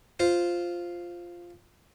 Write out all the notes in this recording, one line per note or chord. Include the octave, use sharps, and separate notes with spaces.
F4 C5